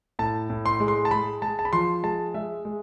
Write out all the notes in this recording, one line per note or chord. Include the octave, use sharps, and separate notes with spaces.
A2 A5
A2
C6
G#3
C6
A5
G#3 B5
G#3 A5
A5
B5
F3 C6
G#3 A5
G#3 E5
G#3